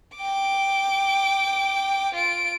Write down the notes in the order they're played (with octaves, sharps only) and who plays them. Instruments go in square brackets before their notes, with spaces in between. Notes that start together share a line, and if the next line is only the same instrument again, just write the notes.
[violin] G5 D6
F4 D7